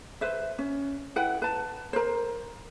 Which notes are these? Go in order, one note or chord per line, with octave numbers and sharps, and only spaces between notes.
B4 C5 E5
C#4
E4 B4 F#5 G5
B4 A5
A#4 C5